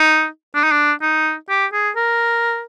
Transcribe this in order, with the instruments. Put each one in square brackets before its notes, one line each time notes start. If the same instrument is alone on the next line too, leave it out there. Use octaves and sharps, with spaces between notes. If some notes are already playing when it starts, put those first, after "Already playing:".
Already playing: [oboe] D#4
D4
D#4
D4
D#4
G4
G#4
A#4